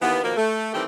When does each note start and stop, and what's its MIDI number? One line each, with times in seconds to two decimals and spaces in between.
0.02 0.20 39
0.02 0.20 52
0.02 0.20 58
0.02 0.20 59
0.24 0.35 47
0.24 0.35 51
0.24 0.35 53
0.24 0.35 58
0.37 0.72 57
0.74 0.84 51
0.74 0.84 52
0.74 0.84 55
0.74 0.84 57
0.74 0.84 60
0.74 0.84 67